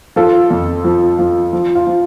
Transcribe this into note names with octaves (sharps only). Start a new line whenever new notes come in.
F3 F4 A4
F2
F3
F3
F3
F4
F3